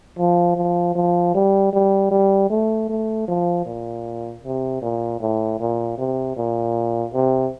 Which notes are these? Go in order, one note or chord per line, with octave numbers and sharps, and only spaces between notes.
F3
F3
F3
G3
G3
G3
A3
A3
F3
A#2
C3
A#2
A2
A#2
C3
A#2
C3